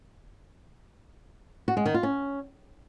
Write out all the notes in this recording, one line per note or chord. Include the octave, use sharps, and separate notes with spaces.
F#4
G#3
D#3
F4
C#4